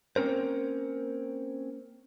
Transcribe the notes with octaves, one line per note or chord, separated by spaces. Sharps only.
A#3 C4 C#4 A#4 C5